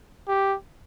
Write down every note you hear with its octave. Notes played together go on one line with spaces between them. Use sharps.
G4